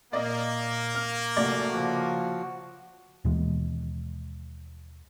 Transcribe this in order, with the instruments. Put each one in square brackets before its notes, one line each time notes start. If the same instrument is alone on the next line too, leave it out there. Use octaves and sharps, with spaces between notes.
[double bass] A#2 [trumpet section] A#3 [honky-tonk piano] D5 D#5
[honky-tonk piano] F6
[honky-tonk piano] A#1 D5 [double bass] C3 A3 [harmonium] F#4
[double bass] C#3 [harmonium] F3 F#4
[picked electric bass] D#2 B2 E3 G#3